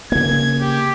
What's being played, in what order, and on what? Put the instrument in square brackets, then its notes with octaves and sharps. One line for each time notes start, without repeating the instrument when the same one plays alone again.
[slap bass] C#3 A#3 [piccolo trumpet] G#6
[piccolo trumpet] G4